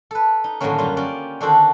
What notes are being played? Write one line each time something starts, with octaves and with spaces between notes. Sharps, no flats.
A4 B4
D#4
A2 D3 D#3 F#3 A#3 C#4
F#2 D3 F#3 G3 F4
C#4 G4 D5
D3 D#3 D4 F#4 A4 C5